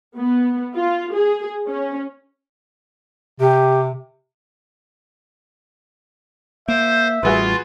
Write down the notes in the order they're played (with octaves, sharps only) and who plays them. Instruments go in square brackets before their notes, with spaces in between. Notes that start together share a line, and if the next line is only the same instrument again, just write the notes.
[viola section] B3
F4
G#4
C#4
[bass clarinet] C3 [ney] G4
[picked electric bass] A#3 [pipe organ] C5 [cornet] E5
[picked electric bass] A1 G3 [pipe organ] F4 [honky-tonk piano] F#4 G#4 B4